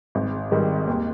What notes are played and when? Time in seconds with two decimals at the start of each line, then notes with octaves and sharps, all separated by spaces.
0.15 G#1
0.51 G#2 D#3 G3
0.87 D#2